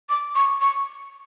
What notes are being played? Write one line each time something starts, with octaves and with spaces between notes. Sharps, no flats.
D6
C#6
C#6